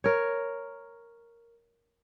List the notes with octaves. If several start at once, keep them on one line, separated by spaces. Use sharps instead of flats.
A#4 C#5